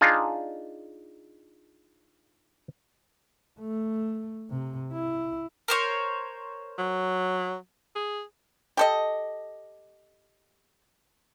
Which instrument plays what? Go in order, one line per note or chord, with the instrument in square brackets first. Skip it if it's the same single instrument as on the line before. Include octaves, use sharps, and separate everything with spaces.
[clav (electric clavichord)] D4 D#4 F4 G#4
[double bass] A3
C3
E4
[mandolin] A#4 C5 C#5
[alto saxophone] F#3
G#4
[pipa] G4 A4 D#5